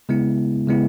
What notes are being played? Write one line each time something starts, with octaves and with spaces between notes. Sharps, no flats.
C#3 G#3 B3 E4
C#3 G#3 B3 E4